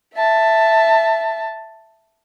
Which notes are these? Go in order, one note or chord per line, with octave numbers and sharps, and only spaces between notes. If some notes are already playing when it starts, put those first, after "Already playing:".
E5 A5